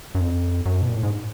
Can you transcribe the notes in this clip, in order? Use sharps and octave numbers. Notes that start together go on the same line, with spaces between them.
F#2
F2
F#2
B2
A#2
A2
G#2